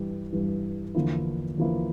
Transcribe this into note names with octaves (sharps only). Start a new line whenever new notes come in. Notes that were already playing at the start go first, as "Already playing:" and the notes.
Already playing: G2 E3 G3
G2 E3 G3
E2 D3 F3 A#3 E4
E2 D3 F3 A#3 E4